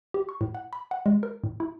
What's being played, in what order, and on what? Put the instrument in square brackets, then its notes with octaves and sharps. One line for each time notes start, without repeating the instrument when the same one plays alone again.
[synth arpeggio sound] G4
C#6
A2
F#5
B5
F#5
G#3
A#4
A2
E4